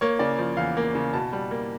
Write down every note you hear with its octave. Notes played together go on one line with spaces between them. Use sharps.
A#3 C#5
C#3 D5
F3
E2 F5
A#3
C#3
B2 A5
G3
A#3